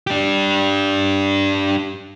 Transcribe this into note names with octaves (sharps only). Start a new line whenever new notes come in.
D4 G4